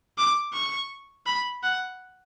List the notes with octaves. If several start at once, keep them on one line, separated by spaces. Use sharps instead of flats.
D6
C#6
B5
F#5